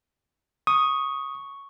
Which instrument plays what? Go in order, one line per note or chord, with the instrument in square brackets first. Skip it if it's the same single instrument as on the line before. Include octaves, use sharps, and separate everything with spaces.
[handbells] C#6 [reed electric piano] D#6